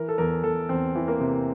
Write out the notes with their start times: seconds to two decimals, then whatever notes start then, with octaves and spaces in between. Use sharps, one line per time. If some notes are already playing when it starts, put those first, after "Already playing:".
Already playing: E3 A#4
0.09 A4
0.18 E2 A#4
0.44 E2 A4
0.69 E2 C4
0.95 E3
1.08 A#3
1.21 C3